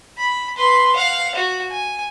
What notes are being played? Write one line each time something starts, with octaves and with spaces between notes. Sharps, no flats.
B5
B4 C6
F5 F#5
F#4
G#5